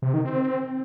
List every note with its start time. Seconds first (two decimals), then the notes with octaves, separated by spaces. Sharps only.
0.02 C3
0.14 D#3
0.25 C4